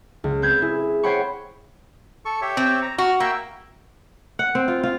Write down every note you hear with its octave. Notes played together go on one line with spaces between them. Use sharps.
C#2
C4 B4 G6 G#6
E4 G#4
C5 C#5 F#5 G5 B5 C#6
A4 C#6
G4 C#5 E5
C4
A#5
F#4 F6
A#3 E5 G5 E6
F#5
C4
F4
F4